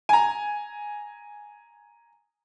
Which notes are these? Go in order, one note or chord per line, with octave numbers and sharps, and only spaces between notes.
G#5 A#5